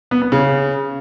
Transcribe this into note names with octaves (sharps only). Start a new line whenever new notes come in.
B3
B3
C#3